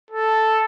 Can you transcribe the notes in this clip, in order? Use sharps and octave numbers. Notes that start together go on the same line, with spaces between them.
A4